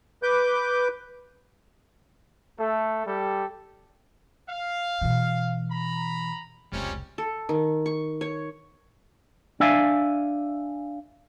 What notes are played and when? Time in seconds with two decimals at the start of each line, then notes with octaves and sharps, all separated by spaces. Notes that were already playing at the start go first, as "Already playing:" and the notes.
0.23 B4 D6 G6
2.58 A3 A4
3.06 G3 G4 A4
4.49 F5
5.01 B2 E3
5.70 A#5 B5
6.72 F1 C#2 C3 G3 C#4
7.18 A4
7.49 D#3
7.86 C#6
8.21 C#5
9.60 D4 D5 E5 F5 G#5